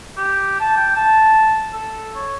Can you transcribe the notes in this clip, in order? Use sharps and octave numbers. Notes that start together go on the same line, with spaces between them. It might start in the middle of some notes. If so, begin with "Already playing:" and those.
G4
A5
G5
A5
A4
C#5